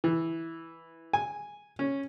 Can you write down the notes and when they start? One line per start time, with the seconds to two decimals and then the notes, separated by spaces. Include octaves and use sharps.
0.04 E3
1.13 G#5
1.79 C#4